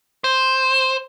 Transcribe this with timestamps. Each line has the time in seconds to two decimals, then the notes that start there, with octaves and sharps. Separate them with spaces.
0.24 C5